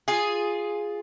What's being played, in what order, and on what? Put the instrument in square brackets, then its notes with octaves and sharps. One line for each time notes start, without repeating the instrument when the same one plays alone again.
[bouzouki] F4 G#4